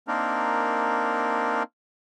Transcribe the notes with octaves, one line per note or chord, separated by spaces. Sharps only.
A#3 C4 D4 D#4 A#4